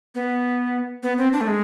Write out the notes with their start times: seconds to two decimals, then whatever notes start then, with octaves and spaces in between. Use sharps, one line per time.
0.15 B3
1.03 B3
1.18 C4
1.33 D4
1.41 A3
1.47 G#3